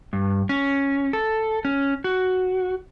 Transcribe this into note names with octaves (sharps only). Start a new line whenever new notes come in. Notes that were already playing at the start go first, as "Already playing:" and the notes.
G2
C#4
A4
C#4
F#4